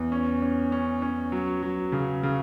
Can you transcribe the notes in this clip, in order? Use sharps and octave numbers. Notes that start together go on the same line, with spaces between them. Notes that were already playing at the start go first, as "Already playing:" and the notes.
Already playing: E2
C#4
C#4
C#4
C#4
F#3
F#3
C#3
C#3